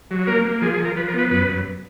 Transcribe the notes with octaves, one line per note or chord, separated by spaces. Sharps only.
F#3
A#3 A#4
A#3
F3 G#4
G#4
F3
A#4
F3 B4
A#4
B3
B4
F#2 B4
F#2